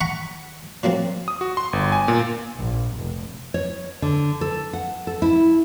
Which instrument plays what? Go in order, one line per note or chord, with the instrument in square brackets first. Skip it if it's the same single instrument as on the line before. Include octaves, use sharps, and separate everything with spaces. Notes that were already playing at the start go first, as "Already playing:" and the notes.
[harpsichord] F#5 A#5 B5 C#6
F3 F#3 A#3 C4
[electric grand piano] D#6
F#4
C6
G1
G#5
A#2
[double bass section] A#1
F1
[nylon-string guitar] C#5
D3
A4
F#5
A4
E4